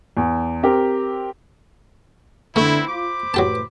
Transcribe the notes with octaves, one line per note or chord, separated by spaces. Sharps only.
E2
C4 G4 A#4
D3 A3 B3 C4 E4
F4 C5 B5 D6
A2 F#3 G4 B4 A5